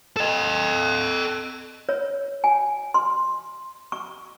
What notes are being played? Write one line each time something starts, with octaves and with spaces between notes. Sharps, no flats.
A4 D#5
C#5
G#5
C6
C#6